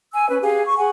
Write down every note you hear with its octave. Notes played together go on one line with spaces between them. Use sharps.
G#5 E6
C#4 B4
G4 G#4 F5 G#5
C#6
G#4 F#5 G#5